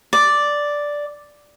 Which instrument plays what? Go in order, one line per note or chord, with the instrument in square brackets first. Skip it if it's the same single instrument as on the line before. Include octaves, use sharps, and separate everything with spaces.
[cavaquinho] D5